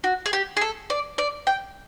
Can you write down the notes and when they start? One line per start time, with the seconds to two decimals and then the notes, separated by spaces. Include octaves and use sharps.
0.04 F#4
0.26 G#4
0.33 G4
0.57 G#4
0.61 A4
0.90 D5
1.18 D5
1.47 G5